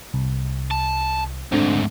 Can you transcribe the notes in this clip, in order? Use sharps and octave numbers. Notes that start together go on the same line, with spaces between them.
C2
A5
D2 G#2 D3 C4